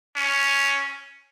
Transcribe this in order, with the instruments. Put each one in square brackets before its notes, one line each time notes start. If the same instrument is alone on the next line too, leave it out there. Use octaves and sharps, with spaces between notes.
[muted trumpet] C#4